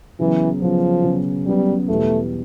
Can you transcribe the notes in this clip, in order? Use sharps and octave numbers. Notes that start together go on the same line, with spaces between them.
C#3 E3 F#3 B3
C#3 F3 F#3 B3
C#3 F#3 B3
C#3 F#3 G3 B3
E2 B2 G3 A3